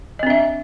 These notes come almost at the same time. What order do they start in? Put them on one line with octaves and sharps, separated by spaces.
D#5 C4 D4 E5